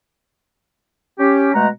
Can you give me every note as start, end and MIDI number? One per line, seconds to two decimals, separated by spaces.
1.19 1.52 61
1.19 1.52 67
1.54 1.68 47
1.54 1.68 56
1.54 1.68 57
1.54 1.68 78
1.54 1.68 82